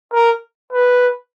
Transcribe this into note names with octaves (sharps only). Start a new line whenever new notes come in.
A#4
B4